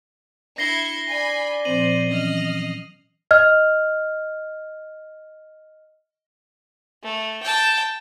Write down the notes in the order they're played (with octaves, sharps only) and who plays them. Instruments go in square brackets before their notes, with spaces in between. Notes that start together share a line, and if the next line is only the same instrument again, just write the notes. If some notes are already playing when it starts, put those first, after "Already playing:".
[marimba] D4 [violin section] E4 G#6 C#7 [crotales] A#6 C7 G7
[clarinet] D5 [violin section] G#5 B5
[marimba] A#2 F3 C4 [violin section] C5 [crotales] D#7 F#7
[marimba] E3 F#3 C#4 [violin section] D#5 F6
[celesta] D#5 F6
[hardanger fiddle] A3
G5 A5